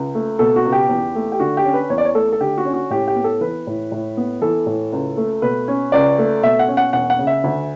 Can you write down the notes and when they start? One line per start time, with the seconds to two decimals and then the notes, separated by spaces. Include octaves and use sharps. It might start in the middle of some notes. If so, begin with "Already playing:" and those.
Already playing: C#2
0.15 A3
0.39 B2 A4
0.56 F#4
0.65 C#2
0.72 G4
0.89 E2
1.15 A3
1.32 G4
1.40 D3 F#4
1.57 G4
1.65 C#4
1.74 B4
1.90 E2 C#5
1.98 D5
2.05 C#5
2.15 A3 A4
2.33 A4
2.40 D3 G4
2.58 F#4
2.65 C#4
2.74 F#4
2.90 A2 G4
3.08 G4
3.16 B3
3.24 A4
3.41 E3 B4
3.67 A2
3.92 A2
4.17 B3
4.42 E3 A4
4.66 A2
4.93 C#2
5.17 A3
5.42 B2 B4
5.68 C#4
5.92 C#2 D5
6.19 A3
6.43 B2 E5
6.59 F#5
6.68 C#4
6.77 F#5
6.93 E1 F#5
7.10 F#5
7.19 C#3
7.27 E5
7.44 D2